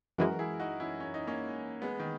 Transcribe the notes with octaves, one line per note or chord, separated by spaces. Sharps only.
F#2 E3 G#3 F#4 A#4
E4 G#4
D#4 F#4
C#4 E4
C#4
D#4
A#3 C#4
G#3 B3
D#3